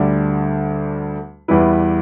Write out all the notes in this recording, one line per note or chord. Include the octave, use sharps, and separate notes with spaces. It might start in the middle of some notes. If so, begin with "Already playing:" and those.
Already playing: D2 D3 G3 D4
E2 E3 G3 E4 B4